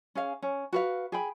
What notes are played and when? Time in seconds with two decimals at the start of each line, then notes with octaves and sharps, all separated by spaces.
0.15 C#4 G#4 F5
0.42 C#4
0.73 F#4 B4 F5
1.12 G#4 G5 B5